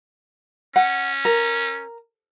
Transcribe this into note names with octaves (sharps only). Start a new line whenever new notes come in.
C#4 F#5
A#4